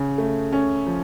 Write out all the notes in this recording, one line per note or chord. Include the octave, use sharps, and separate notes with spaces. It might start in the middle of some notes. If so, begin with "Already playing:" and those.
Already playing: C#3
A3
C#4
F3